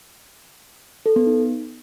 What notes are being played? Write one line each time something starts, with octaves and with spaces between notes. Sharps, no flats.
A4
B3
D#4